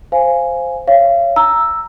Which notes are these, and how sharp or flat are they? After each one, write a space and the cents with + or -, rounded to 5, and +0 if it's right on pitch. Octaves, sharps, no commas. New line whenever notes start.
C5 +0 F5 -10 G#5 +0
C#5 +0 F5 -35
A#5 +0 E6 +0